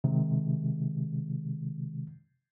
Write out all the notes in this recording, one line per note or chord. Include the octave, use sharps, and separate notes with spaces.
C3 D#3 G#3